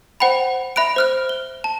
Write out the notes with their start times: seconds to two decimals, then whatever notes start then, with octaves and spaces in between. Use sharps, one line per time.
0.20 C5 F#5 G5 B5
0.76 E5 B5 F#6 D7
0.96 C5 F6 F#6
1.29 G7
1.64 A5